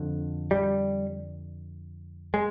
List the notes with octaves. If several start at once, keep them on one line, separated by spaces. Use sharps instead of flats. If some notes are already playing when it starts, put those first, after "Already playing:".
Already playing: F2 D3
G3
G#3